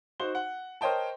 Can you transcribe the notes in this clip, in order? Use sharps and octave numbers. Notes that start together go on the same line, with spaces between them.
D#4 F#4 C5 G7
F#5
A#4 C5 C#5 D#5 G5 A5